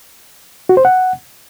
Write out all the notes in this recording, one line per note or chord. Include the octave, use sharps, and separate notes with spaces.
F#4
C5
F#5